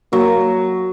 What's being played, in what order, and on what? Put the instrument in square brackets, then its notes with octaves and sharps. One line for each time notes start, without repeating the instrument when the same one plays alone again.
[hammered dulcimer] F#3 [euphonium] A#3